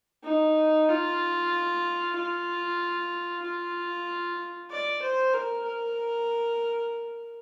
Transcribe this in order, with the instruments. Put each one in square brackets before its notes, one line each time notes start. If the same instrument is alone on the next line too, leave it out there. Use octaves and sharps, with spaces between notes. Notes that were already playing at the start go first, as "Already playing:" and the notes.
[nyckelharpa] D#4
F4
F4
F4
D5
C5
A#4
A#4